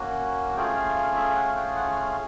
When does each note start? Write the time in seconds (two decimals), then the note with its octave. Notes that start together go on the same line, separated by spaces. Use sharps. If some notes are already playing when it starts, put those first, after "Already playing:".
Already playing: A#3 C#4 F#4
0.56 A3 C#4 F4 G#4 G5
0.76 F5
0.96 F5
1.17 E5
1.36 F#5
1.56 G5
1.76 F#5
1.96 F5